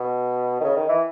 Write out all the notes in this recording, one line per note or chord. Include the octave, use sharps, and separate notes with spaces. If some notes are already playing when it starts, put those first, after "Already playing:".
Already playing: B2
D#3
C#3
D#3
E3